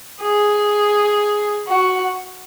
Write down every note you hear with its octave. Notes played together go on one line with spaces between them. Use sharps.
G#4
F#4